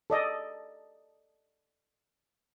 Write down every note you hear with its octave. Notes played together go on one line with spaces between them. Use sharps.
A4 D5 D#5